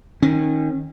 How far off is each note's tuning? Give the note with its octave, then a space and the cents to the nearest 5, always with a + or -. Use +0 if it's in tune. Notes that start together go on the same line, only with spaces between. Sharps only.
D#3 +0 C#4 -25